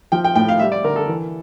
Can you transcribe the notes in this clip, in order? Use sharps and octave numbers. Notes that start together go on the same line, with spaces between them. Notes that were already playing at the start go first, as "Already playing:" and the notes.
F3 G5
G5
A2 G5
F5
G3 E5
D5
D3 A#4
A4
E3